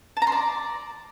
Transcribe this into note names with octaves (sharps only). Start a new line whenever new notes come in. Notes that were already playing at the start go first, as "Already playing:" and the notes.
A5
A#5
C6
D5